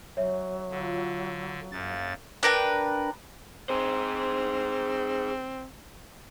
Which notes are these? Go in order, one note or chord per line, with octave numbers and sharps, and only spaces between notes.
F#3 C#4 C5 C#5 E5
D3 F3
F#2 C#3 A#3 A6
D4 A#4 B4 G5
C4 G#4 C5